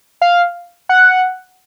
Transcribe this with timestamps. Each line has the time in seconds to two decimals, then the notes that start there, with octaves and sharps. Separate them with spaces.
0.22 F5
0.89 F#5